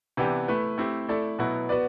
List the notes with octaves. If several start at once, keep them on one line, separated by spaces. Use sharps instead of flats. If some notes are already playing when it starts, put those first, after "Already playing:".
C3 E3 B3 D4 G4
A3 E4 B4
A3 C4 E4 G4
A3 E4 A4 D5
B2 F#3 B3 E4
B3 F#4 B4 D5